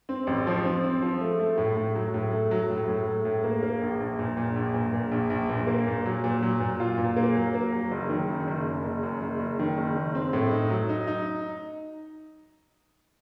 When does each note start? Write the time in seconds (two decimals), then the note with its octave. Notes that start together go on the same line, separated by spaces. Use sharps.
0.09 C4
0.27 A1
0.47 F3
0.65 C4
0.83 C4
1.02 F3
1.21 A3
1.40 A3
1.58 A2
1.77 A2
1.95 F#3
2.14 A2
2.33 A3
2.51 F#3
2.70 A2
2.88 A2
3.06 A3
3.25 A2
3.44 A#3
3.63 A#3
3.82 A#1
4.00 A#1
4.19 A#2
4.37 A#2
4.56 A#1
4.74 A#2
4.93 A#2
5.12 A#1
5.30 A#1
5.49 A#2
5.67 A#3
5.87 A#2
6.06 F#3
6.24 A#2
6.42 F#3
6.60 A#2
6.80 F4
6.98 A#2
7.16 A#3
7.35 F#3
7.54 A#3
7.73 F#3
7.92 F#1
8.10 D#3
8.29 F#2
8.48 F#1
8.66 F#2
8.84 F#1
9.03 F#2
9.22 F#1
9.40 F#1
9.59 D#3
9.78 F#1
9.97 F#1
10.15 C4
10.33 A2
10.52 D#4
10.70 F#3
10.89 D#4
11.07 D#4